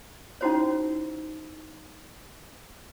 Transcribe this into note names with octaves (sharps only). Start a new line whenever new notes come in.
C#4 D#4 E4 F#4 C5 C#5